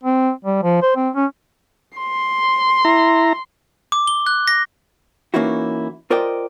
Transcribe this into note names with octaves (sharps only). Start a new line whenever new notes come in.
C4
G3
F3
C5
C4
C#4
C6
E4 A#5
D6
G7
F#6
A#6
E3 A#3 C#4 D#4 E4 F#4
F4 A#4 C5 D5 D#5 G5